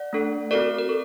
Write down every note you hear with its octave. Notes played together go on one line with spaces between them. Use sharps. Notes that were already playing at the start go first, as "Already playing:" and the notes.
Already playing: D5 F#5
A3 D4 A4
C4 F#4 A4 A#4 D5
A#4
A4